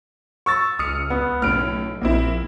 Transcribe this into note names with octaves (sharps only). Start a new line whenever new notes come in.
C#6 E6 A6
C#2 D#6 F6 C#7
B3
B1 A2 C#4 F6 D7
A#1 A#3 C4 E4